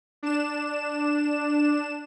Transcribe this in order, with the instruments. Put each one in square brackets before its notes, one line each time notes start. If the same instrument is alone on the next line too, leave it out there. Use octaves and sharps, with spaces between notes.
[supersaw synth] D4 E7